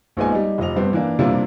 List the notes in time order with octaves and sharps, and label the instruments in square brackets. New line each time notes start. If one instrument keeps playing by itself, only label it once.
[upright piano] A#1 A#2 G#3 B3 D#4 G#5
G3 D#4
F1 F3 D#5 F7
G2 G3 B3 C4
E3 A#3 D4
F2 C3 G3 A#3 D4 E4